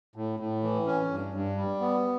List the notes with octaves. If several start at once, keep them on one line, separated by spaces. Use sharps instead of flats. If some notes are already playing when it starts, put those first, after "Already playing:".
A2
A2
E3
C#4
G2
G2
G3
B3